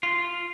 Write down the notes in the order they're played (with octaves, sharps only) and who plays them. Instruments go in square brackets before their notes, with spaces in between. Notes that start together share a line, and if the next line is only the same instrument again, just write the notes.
[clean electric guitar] F4